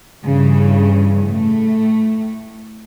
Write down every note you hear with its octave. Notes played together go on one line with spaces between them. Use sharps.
G2 C#3 E3
A2 A3